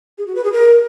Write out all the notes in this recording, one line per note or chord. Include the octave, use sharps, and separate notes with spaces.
G#4
F#4
B4
G#4
A#4